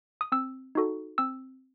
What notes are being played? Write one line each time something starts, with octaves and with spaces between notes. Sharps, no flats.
D#6
C4 E6
D#4 F#4 A4
C4 E6